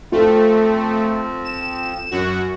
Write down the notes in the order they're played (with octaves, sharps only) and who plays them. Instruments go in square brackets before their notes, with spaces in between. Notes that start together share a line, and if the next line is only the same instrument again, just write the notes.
[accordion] F3 C4 [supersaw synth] A3 [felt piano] F4 A4
[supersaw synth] E7
F#2 F#4